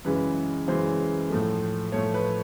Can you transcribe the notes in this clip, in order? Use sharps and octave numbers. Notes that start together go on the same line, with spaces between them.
F#2 C#3 E3 G#3 B4
F#2 C#3 E3 G#3 C5
A2 F3 A3
A2 F3 A3 C#5
B4